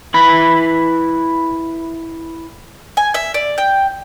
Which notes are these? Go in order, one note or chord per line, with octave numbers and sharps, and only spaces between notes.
E4 B4 B5
G#5
E5
D5
G5